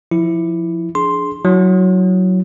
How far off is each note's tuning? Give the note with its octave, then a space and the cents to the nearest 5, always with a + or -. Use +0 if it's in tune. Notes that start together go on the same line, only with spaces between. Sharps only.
F3 +0 E4 +0
D4 +0 G#4 +20 C6 +0
F#3 +0 E4 +0